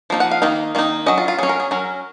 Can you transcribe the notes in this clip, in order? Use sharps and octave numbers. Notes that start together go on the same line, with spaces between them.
F3 A#3 D#4
F#5
F5
D#3 A#3 D#4
D#3 A#3 D#4
F#3 C#4 D#5
F4
F4
F#3 C#4 G#4
A#4
G#4
F#3 C#4 A#4